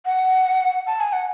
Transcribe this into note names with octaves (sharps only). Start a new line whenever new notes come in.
F#5
A5
G#5
F#5